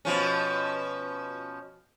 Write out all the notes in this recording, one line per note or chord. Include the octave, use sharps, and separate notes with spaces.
B2 F3 C#4